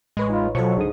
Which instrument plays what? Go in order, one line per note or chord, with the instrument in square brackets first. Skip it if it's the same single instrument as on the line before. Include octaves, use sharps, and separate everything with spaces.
[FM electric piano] A1 B4 C#5 [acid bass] G#3
[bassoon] D#4 [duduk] F4
[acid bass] B2 [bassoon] F3 [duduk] F#3 [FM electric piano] A4 C#5 C#6
[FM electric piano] C#2 D3 D#6 [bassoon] G#2